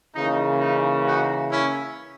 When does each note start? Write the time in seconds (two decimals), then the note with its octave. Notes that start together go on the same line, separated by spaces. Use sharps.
0.15 C#3 E3 A#3 D#4
0.60 D#4
1.07 D#4 F#4
1.52 C#4 E4